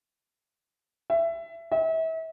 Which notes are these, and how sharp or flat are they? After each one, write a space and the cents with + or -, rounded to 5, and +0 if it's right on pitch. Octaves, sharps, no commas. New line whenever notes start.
E5 +20
E5 -35